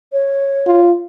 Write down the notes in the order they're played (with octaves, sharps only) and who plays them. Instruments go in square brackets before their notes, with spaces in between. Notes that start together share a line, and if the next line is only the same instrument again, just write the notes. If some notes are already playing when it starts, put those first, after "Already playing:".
[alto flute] C#5
[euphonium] F4